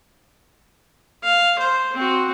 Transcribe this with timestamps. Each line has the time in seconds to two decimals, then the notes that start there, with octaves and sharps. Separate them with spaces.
1.24 F5
1.59 C5
1.94 C4 F#4